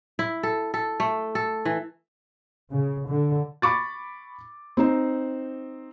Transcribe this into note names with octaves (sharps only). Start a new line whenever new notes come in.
E4
A4
A4
A3
A4
E3
C#3
D3
B5 C#6 D6 A6
C4 D#4 C5